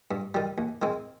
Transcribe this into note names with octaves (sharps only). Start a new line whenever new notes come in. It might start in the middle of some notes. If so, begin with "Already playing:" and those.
G2
D#3 G3
D#2
D#3 G#3 C4